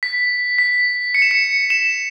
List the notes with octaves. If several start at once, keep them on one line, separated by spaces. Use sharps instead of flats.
B6
B6
C#7
E7
C#7
E7